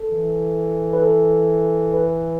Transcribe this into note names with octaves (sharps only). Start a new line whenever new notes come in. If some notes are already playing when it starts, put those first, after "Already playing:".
Already playing: A4
E3
B4
A4
B4